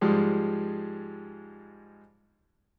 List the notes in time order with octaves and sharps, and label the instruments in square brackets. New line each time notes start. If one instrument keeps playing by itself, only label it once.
[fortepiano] G#2 F3 G3 G#3